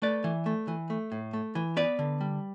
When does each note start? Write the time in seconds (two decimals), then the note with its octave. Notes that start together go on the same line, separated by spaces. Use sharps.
0.02 A3 B4 D5
0.24 E3
0.46 A3
0.68 E3
0.90 A3
1.12 A2
1.33 A3
1.55 E3
1.77 B3 B4 D5
1.99 D3
2.21 G3